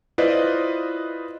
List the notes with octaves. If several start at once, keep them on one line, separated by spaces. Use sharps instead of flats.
E4 F4 B4 C5 D5 D#5